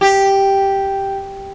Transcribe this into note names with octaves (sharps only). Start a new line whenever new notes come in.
G4